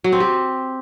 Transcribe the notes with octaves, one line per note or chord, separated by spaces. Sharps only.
F#3
C4
G4